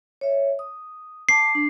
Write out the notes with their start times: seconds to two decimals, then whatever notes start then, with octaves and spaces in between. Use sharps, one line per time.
0.21 C#5 E5
0.59 D#6
1.29 A5 D6 C7
1.55 D4